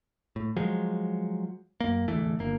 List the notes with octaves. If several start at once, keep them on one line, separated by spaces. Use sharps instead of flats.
A2
F3 F#3 G#3
F#2 A#3
D1 E2 E3 A3
G1 A#3